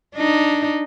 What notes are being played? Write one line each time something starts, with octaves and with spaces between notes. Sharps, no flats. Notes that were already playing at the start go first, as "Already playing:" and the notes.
D4 D#4